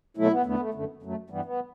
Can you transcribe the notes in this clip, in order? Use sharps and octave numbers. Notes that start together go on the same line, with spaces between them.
B2 F#3 A3 E4
B3
E2 D3 A3 B3
A3
F#2 D3 A3
F#2 F#3 A3
G2 E3 G3 B3
B3